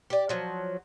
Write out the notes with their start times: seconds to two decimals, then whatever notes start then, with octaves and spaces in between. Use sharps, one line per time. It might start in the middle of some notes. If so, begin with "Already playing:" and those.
0.10 G4 D5
0.29 F3 F#3